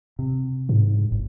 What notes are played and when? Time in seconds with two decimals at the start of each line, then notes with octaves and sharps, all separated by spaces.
0.19 C3
0.69 G#2
1.12 G1